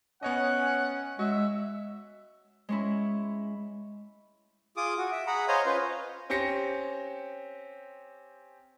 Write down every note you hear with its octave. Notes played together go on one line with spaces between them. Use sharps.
B3 C#4 C#5 D#5 F#5
G#3 F#4 E5
G#3 C#4 E4
F4 G#4 D6 D#6
F#4
E5
G#4 F#5 A#5 B5
C5 C#5 D#5 F5 G#5 A#5
C#4 F4 B4 C5
C4 C#4 G4 A#6 C#7